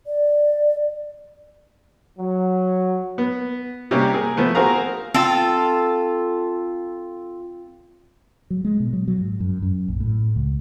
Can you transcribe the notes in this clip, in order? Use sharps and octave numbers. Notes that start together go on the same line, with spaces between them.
D5
F#3
B3
C3 G3 A#3 C#4 G4
G#4 A#4
F3 A3 B3
C4 F#4 G#4 A#4 F5 A#5
C4 F4 A4
F#3
G#3
B2
F#3
F#3
G#2
F#2
F#2
A#1
A2
C#2